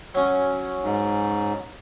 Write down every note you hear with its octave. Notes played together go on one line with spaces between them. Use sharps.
F#3 C#4
G#2